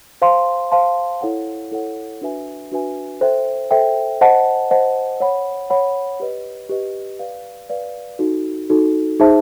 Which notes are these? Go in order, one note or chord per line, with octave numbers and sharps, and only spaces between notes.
C5 F5 A5 C6
C5 F5 A5 C6
E4 A4 C#5 F#5
E4 A4 C#5 F#5
D4 F#4 B4 E5 G#5
D4 F#4 B4 E5 G#5
A4 C5 E5 G5
A4 C5 E5 G5
C5 D#5 F#5 A5
C5 D#5 F#5 A5
C#5 F#5 B5
C#5 F#5 B5
G4 B4 D#5
G4 B4 D#5
B4 D5 F5
B4 D5 F5
D#4 F#4 A4
D#4 F#4 A4
D#4 G#4 C5 E5 A5